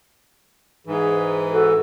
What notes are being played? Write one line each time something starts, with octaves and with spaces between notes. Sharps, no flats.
G#2 E3 G#4
F#4 A4